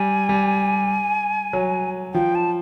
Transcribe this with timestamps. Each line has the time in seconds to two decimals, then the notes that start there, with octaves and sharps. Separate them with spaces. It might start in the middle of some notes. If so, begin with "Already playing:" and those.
Already playing: G3 G#5
0.29 G3
1.53 F#3
2.14 F3 G5
2.35 A5